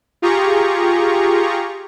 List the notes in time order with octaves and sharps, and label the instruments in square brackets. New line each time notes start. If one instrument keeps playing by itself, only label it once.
[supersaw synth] F4 G4 G#4 A#5 C#6